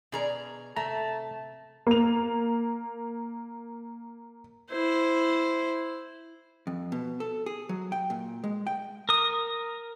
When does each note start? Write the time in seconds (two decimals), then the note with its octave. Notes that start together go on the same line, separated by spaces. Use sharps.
0.12 B2 D4 G#4 D5 A#5
0.76 C3 A3 A5 A#5
1.87 A#3 F7
4.71 E4 C5
6.67 F2
6.92 B2
7.20 A4
7.46 G#4
7.69 F#3
7.92 G5
8.10 A#2
8.44 G#3
8.67 G5
9.09 A#4 D#6